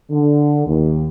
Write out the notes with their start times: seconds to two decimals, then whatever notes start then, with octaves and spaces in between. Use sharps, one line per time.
0.11 D3
0.66 D#2